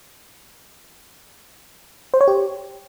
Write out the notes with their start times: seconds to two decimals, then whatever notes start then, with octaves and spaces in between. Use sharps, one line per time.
2.14 C5
2.21 C#5
2.28 G4